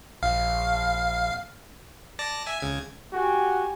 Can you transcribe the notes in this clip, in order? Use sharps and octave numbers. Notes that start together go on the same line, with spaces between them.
A#1 F5
D5 A5 A#6
E5 G#5
C#2 C#3 G#6
F#4 G4 G#5